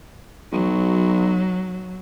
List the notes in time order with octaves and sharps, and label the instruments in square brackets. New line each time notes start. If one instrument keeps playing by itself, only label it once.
[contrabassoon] B1 [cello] F#3